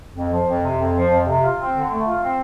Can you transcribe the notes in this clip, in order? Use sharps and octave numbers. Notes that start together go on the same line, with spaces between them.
F2
F3
F2
C3
F2
F3
F2
C3
F4
C4
D3
A3
F4
C4